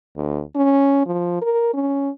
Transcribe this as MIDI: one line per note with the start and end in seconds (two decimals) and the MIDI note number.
0.16 0.42 38
0.56 1.01 61
1.06 1.40 53
1.42 1.73 70
1.74 2.09 61